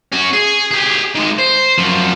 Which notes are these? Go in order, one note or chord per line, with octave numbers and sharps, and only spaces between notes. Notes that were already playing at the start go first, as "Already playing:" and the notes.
C#4 F#4
G#4
G4 G#4
D#3 G#3
C5
F#2 F3